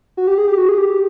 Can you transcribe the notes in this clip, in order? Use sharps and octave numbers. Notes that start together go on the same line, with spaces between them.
F#4
G4
G#4
G4
F#4
G#4
G4